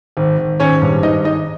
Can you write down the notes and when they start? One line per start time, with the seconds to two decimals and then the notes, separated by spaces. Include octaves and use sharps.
0.17 G#1
0.38 G#1
0.60 G#1 C#4 C#5
0.82 G2
1.03 G#1 D#4 D#5
1.25 G#1 D#4 D#5